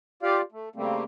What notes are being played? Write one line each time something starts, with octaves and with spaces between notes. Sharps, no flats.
F4 G4 D5 F5
A3
C#3 G3 A3 A#3 C4